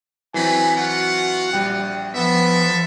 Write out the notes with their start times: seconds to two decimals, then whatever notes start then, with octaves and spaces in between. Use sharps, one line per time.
0.34 E3 F#3 B3 C4 D#4 G#5 B5
0.76 F4 F#4 F#5
1.53 A#1 G3 G5 F#6
2.15 F3 B3 A4 E5